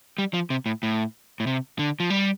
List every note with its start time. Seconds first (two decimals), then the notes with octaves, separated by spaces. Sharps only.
0.18 G3
0.34 F3
0.50 C3
0.66 A2
0.83 A2
1.40 A2
1.47 C3
1.79 D3
2.00 F3
2.10 G3